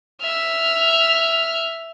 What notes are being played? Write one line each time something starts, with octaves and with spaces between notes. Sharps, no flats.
E5 F6